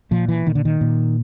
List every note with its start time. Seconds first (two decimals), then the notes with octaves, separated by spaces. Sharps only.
0.11 A#2 F3
0.29 E3
0.46 A#2 D#3
0.55 D3
0.65 D#3
0.81 A#2